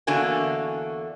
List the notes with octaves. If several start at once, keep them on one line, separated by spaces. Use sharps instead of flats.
E2 D3 A#3 D4 F#4 G#5